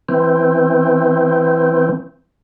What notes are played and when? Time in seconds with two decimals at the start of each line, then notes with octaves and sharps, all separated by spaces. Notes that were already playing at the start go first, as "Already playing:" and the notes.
0.09 E3 C4